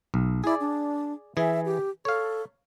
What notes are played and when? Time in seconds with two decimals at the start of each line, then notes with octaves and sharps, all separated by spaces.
0.14 B1
0.44 E4 G#4 D5
0.60 D4
1.37 E3 G#4 E5
1.66 G4
2.05 A4 C#5 F5